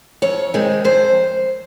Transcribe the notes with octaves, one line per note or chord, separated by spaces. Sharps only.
F2 C#5
D#3 G#3 C4
F2 C5